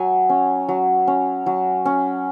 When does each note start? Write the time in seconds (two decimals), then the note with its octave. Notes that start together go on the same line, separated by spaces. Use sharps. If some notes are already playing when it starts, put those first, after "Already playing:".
Already playing: F#3 G#5
0.29 C#4
0.68 F#3
1.07 C#4
1.46 F#3
1.85 C#4